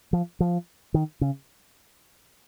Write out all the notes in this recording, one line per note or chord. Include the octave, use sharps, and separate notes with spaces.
F3
F3
D#3
C#3